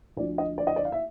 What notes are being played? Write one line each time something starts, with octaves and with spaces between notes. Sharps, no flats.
D2 D3 F3 D5
D#5
D5
D#5
D5
F5
E5